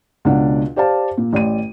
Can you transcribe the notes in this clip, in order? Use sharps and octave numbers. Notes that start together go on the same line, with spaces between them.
C#2 B2 D4 F#5
G4 C5 D5 F5 A5
A#2
A1 D5 D#7